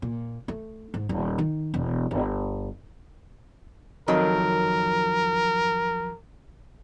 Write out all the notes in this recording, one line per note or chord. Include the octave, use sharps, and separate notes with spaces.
A#2
A3
G#2
D#1
D#3
E1
G1
F2 D#3 F#3 A#4